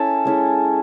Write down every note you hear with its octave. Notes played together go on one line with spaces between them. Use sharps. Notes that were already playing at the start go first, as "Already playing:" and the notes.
Already playing: C#4 E4 A4
G#3 C#4 E4